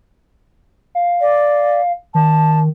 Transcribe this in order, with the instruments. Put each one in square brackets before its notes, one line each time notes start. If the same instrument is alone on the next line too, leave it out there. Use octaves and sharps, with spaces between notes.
[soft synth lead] F5
[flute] D5
[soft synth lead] D#3 [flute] A5